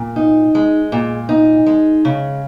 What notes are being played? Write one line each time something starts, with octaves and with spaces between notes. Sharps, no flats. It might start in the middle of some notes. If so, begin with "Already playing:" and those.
Already playing: A#2
D#4
G#3
A#2
D#4
G#3
C#3